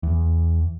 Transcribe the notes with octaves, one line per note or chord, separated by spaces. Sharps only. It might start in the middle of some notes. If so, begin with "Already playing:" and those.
E2